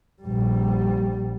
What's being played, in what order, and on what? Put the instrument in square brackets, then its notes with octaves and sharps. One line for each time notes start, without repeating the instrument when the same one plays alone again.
[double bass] A#1 G3